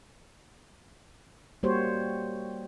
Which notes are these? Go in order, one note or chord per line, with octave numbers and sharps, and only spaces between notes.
G3 A#3 F#4 G4 C5 C#5